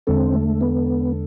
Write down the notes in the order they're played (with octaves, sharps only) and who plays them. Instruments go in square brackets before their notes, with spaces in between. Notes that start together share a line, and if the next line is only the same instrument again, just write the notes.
[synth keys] E2 D3 G#3 D4 A4 [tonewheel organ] C4
[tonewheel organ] A3
B3